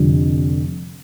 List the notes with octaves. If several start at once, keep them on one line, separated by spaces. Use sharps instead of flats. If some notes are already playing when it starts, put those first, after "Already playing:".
Already playing: F1 F2 D3 G3